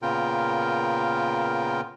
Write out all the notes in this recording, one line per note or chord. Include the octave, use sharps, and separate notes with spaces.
A#2 C#3 B3 F4 A#4 G5